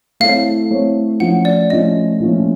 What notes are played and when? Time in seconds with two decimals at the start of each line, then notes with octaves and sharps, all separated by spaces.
0.20 A3 C4 E4 A4 C#5 F5
0.71 A3 C4 E4 A4 C#5
1.20 F3 A3 C#4 F4 F#5
1.45 D5
1.70 F3 A3 C#4 F4 D#5
2.20 A#2 F3 A3 C#4